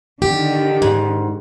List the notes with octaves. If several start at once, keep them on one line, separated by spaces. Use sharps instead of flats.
D3 D#3 G4
G#2